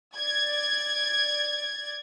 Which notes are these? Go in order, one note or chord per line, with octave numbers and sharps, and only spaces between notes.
D5 G#6 A6